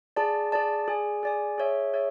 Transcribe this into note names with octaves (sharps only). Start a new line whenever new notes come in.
G#4 D5 A5
G#4 D5 A5
G#4 D5 G#5
G#4 D5 G#5
G#4 C#5 E5
G#4 C#5 E5